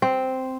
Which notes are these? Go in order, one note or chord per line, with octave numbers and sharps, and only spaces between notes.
C4